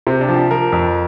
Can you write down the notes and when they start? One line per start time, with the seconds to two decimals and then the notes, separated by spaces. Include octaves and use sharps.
0.07 C3 C4
0.21 D4
0.28 F3
0.36 G4
0.51 F3 A#4
0.72 F2